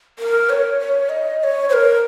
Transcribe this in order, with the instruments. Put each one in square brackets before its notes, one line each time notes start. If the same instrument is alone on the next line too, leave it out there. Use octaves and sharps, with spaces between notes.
[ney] A#4
C#5
C#5
D#5
D#5
C#5
C5
A#4